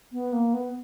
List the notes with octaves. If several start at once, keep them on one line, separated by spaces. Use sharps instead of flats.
B3
A#3
B3